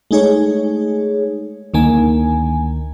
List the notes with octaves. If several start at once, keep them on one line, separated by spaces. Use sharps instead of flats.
G#3 A3 D#4 G#4 C#5
D2 D#3 A#3 G#5